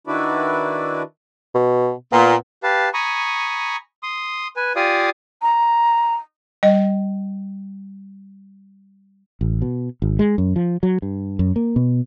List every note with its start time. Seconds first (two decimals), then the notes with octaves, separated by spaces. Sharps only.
0.07 D#3 D4 E4 F#4 B4 D5
1.55 B2
2.12 A#2 B3
2.63 G4 B4 F5 A5
2.94 G#5 A#5 B5 C#6 D#6
4.03 C6 D#6
4.56 B4 G#5
4.76 F4 G4 D5 F5 G#5 D#6
5.42 A#5
6.63 G3 D#5
9.41 A1
9.62 B2
10.02 G#1
10.19 G#3
10.38 F#2
10.56 F3
10.83 F#3
11.02 G2
11.39 F#2
11.56 A#3
11.76 B2